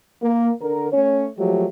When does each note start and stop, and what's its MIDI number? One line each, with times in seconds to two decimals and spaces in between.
0.23 0.50 58
0.61 0.88 50
0.61 0.88 70
0.92 1.28 57
0.92 1.28 61
0.92 1.28 73
1.38 1.66 53
1.38 1.66 54
1.38 1.66 56
1.38 1.66 57
1.38 1.66 67